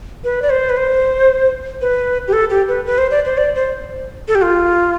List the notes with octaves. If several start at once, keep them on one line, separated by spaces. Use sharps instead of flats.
B4
D5
C5
B4
C5
B4
G4
A4
G4
B4
B4
C5
D5
C5
D5
C5
A4
G4
F4